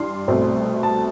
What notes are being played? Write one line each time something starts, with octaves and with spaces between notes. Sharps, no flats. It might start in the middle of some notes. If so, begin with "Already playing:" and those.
Already playing: G2 E3 D4 C6
C2 B2 A3 C4
A5